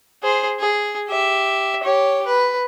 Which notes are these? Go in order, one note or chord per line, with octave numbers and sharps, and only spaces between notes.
G#4 C5
G#4
G4 E5
G4 C#5
B4